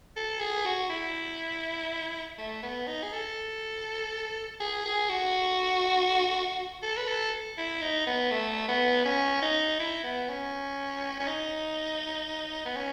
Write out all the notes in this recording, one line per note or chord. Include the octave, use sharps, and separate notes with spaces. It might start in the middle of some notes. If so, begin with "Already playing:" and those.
A4
G#4
F#4
E4
A3
B3
D#4
G#4
A4
G#4
G#4
F#4
A4
B4
A4
E4
D#4
B3
A3
B3
C#4
D#4
E4
B3
C#4
C#4
D#4
B3
C#4